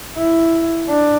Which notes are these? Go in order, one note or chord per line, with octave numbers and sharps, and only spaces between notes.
E4
D4